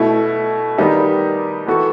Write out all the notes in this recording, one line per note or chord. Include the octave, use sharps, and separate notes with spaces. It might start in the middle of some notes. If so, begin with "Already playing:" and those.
Already playing: B2 A3 E4
D#3 G3 B3 D#4 G4
E3 B3 F#4 A4